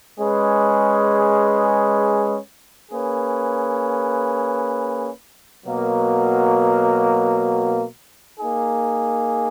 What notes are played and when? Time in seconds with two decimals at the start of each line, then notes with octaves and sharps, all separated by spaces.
0.18 G#3 C#4 G#4 B4
2.91 A#3 C#4 G#4 B4
5.65 B2 F#3 A#3
8.38 A#3 D#4 G#4